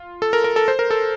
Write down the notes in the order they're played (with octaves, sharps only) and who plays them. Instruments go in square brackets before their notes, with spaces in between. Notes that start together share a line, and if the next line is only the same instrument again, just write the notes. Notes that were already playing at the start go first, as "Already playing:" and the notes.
Already playing: [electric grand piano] F4
A4
A#4
A#4
A4
C5
A#4
A4